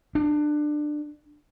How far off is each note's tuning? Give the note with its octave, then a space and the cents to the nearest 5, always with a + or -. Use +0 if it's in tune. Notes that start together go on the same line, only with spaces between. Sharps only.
D4 +20